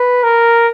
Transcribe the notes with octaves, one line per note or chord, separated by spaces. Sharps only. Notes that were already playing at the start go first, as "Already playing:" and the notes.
Already playing: B4
A#4